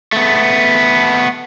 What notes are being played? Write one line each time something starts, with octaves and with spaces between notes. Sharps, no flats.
A3 B3